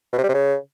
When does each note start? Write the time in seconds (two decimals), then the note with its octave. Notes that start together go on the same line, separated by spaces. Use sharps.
0.13 B2
0.18 C3
0.24 G3
0.29 C3
0.34 C#3